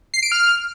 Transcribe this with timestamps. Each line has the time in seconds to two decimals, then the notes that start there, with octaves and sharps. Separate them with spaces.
0.14 C7
0.23 D7
0.32 F6